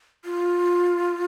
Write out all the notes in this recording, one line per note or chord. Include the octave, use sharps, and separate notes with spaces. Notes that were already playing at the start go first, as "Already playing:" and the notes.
F4